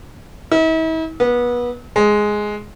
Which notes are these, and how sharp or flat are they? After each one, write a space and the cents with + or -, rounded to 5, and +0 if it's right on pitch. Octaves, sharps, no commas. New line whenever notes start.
E4 -45
B3 -25
G#3 +5